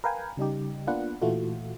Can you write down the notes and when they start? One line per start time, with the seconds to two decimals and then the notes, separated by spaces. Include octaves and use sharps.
0.04 A#4 B4 F5 G5 G#5
0.37 C#3 G3 D#4 G4
0.87 A#3 B3 D4 F4 B4 F#5
1.21 A#2 E3 A3 F4 F#4